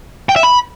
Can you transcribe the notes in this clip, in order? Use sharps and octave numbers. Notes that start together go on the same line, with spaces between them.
G5
E5
B5